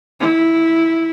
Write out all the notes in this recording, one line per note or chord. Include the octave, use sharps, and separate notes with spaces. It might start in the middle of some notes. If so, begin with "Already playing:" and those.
E4